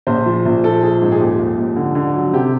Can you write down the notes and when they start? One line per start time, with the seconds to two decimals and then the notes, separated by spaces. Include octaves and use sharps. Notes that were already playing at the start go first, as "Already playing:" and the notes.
0.07 A#1 C5
0.26 F3
0.46 A#1
0.64 F3 A4
0.83 F3 G#4
1.02 G#2
1.12 G#4
1.20 D#2 G4
1.39 D#2
1.58 D#2
1.76 D3
1.95 D3
2.14 F#3
2.33 C3 G4